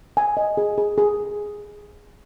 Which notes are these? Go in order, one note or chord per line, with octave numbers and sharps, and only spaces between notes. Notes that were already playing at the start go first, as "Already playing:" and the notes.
G#5
D#5
G#4
G#4
G#4